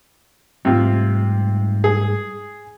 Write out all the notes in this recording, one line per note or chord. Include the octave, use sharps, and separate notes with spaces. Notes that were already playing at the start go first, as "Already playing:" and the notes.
G#2 C3 G3 A3 F4
G#4